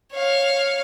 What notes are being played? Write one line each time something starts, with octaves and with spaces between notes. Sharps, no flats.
C#5 F5